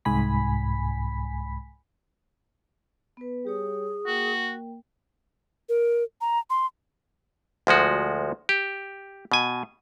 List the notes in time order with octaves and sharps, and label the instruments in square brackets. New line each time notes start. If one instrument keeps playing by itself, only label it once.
[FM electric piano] C2 G#2 G#5 B5 B6
[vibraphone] B3 B4
[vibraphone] G3 G4 C#5 [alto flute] G#4
[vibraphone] A#3 A#4 G5 [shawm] F#4
[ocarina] A#4
A#5
C6
[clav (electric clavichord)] D2 F3 G#3 F#4
G4
B2 G#5